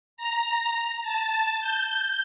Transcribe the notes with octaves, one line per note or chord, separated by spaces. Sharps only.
A#5
A5
G6